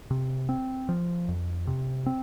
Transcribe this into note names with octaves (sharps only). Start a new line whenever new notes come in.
C3
C4
F3
F2
C3
C4